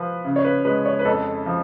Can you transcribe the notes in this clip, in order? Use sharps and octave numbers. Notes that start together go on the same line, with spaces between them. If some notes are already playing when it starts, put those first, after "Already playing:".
Already playing: F3 B4
C#3
C#5
B4
G#3 B4
C#5
B4
F2 A4
F3